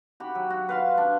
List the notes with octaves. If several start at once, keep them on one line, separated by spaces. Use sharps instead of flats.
F#4 G4 B5
F#3
F#4
B4 F5 C6
D4